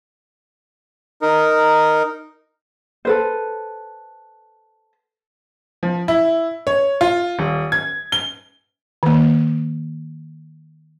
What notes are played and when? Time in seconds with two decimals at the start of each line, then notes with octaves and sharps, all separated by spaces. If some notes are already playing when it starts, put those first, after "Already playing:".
1.22 D#4 A#4
3.05 A4 B4 C5
5.83 F3
6.08 E4
6.67 C#5
7.01 F4
7.39 D#1
7.72 G#6
8.12 G7
9.03 D#3 A#3